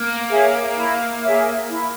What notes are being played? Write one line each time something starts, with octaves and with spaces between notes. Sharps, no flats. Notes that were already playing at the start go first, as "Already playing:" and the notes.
Already playing: A#3
G#4 C#5 E5
E4
G#4 C#5 E5
E4